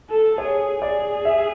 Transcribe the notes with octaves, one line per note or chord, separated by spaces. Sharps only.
A4
G#4 C#5
G#4 D5
E5